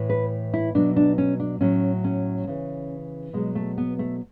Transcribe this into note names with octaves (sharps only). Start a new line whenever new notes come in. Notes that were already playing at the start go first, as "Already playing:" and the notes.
Already playing: A2 E3
B4
E4
B2 F#3 D4
D4
C#4
D4
A2 F#3 C#4
C#4
C#3 E3
B2 F#3 G#3
A3
B3
A3